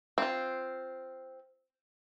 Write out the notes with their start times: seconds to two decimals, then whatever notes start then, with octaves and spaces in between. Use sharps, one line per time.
0.18 C4 F4